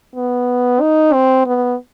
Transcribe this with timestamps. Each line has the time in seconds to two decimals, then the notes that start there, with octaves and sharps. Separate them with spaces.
0.16 B3
0.81 D#4
1.13 C4
1.46 B3